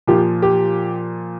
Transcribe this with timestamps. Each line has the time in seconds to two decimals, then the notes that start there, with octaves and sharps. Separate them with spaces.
0.08 A#2 F3 G4
0.42 G4